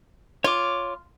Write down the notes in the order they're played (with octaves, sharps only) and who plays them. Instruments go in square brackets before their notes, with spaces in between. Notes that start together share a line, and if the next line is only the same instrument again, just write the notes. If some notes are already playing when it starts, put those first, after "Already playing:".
[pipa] F4 [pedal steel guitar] C#5 D6